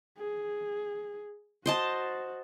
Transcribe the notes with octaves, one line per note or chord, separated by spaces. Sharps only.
G#4
F#4 C5 D#5 A5